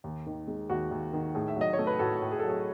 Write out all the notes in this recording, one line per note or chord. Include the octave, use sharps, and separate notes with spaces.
D#2
D#3
G#3
D#2 F#4
D#2
D#3
A2 G#4
E5
F#3 D#5
C#5
A3
B4
A2 F#4 A4
A2
G#4
A4
F#3 G#4